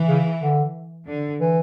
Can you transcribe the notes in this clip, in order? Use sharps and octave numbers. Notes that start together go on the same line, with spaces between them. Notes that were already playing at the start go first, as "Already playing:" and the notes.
Already playing: E3
C#3
D3
D3
E3